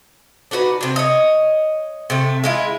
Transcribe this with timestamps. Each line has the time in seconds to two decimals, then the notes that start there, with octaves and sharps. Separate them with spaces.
0.51 D4 D#4 F#4 B4
0.81 C3 D4
0.96 C#5 D#5
2.10 C3 A3
2.44 G#3 E4 F4